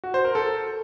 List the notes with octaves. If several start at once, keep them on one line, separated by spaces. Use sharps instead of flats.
F#4
C5
A#4
A4